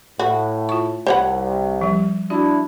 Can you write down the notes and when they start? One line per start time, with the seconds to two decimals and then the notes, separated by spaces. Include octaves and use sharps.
0.19 A2 F#4
0.69 F4 C#6
1.07 C2 C5 C#5 F#5 B5
1.81 F3 G3
2.30 D4 E4 F#4